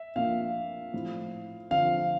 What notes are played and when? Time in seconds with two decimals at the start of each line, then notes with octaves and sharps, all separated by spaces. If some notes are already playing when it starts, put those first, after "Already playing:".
Already playing: E5
0.16 A#2 F3 A#3 D4 F5
0.93 A2 F3 C4 E4
1.71 D3 F3 C4 F5